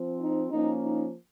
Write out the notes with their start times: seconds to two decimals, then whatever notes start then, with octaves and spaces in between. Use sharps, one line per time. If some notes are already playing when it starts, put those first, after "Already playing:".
Already playing: F3 C4
0.19 D#4
0.50 F3 A#3 C#4 D#4
0.82 D#4